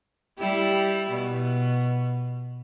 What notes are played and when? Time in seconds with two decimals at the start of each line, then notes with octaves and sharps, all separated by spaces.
0.38 G3 E4 G4
1.10 B2